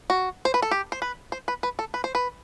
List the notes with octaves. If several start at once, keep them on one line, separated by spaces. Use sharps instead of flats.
F#4
C5
B4
A4
G4
C5
B4
C5
B4
B4
A4
B4
C5
B4